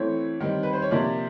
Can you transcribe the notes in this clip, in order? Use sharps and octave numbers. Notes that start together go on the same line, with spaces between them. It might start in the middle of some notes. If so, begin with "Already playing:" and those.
Already playing: E3 A3 C4 C#5
D#3 G3 C4
B4
C5
C#5
C3 F3 A#3 D5